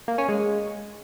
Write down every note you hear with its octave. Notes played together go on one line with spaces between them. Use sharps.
A#3
C#4
G#3